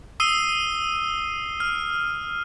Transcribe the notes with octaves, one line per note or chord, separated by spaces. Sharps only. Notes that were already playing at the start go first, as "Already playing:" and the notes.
D#6 E6 C7 D#7 G7
F6